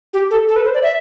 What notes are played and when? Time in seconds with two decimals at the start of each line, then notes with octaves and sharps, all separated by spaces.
0.13 G4
0.31 A4
0.48 A4
0.56 B4
0.65 C5
0.74 D5
0.83 E5